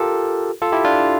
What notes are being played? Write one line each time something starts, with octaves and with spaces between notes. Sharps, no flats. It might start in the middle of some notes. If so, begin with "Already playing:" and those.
Already playing: F4 G4 A4 A#4
F4 A4
E4 G4
D4 F4